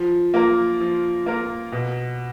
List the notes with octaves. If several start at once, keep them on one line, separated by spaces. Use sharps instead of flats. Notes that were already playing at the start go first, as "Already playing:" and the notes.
Already playing: F3
A#3 F4 A#4
F3
A#3 F4 A#4
B2